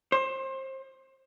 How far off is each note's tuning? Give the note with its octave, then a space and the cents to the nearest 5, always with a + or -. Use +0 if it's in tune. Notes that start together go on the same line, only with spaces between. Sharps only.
C5 +25